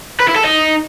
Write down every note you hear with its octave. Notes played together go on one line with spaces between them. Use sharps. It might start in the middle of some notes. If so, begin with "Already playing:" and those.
B4
E4
A4
D#4